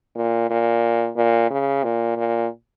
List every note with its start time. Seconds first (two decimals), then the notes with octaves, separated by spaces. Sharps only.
0.16 A#2
0.50 A#2
1.16 A#2
1.50 C#3
1.83 A#2
2.17 A#2